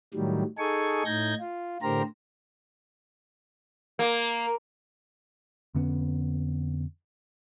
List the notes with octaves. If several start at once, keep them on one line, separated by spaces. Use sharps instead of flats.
A2 D#3 F#3 G3
D#4 G#4 A4 G#5 C#6
A2 D#4 G6 G#6 A#6
F4
A2 D3 G4 A#4 C5 A#5
A#3
F2 D3 B3 C#4